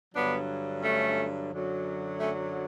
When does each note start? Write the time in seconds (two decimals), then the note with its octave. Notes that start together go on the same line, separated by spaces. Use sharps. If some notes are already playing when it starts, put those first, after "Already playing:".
0.15 G2 D3 F#3 B3 D4
0.83 A3 C#4
1.52 F#2 D3 F#3
2.20 A3 C#4